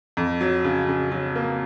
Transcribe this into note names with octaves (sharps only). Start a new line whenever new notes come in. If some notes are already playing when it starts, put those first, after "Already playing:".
F2
F#3
C#3
C#3
F#3
A#3